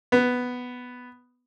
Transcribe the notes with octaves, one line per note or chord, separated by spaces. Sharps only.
B3